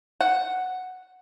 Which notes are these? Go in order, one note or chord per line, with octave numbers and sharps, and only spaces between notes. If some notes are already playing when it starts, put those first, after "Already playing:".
F#5